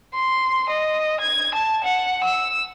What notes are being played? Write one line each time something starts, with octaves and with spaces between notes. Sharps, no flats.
C6
D#5
G#6
A5
F#5
E6